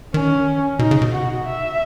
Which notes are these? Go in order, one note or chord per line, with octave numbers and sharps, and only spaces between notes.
D#3 C#4
B2 D#4
C#3
B2
F#4
E5